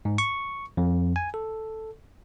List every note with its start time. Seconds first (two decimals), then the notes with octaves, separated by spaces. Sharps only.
0.05 G#2
0.18 C#6
0.77 F2
1.16 G#5
1.34 A4